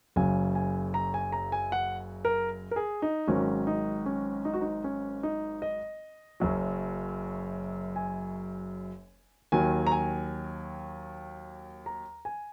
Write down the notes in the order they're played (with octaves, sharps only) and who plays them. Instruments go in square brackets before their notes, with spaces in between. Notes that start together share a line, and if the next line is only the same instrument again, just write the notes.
[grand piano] F#1 F#2 C#3 F#3 G#5
G#5
A#5
G#5
A#5
G#5
F#5
A#4
A#4
G#4
D#4
G#1 G#2 D#3 F#3 C#4
D#4
C#4
D#4
F#4
D#4
C#4
D#4
D#5
F#1 F#2 F#3
G#5
D#2 D#3 F#3 G#5
A#5
G#5
A#5
G#5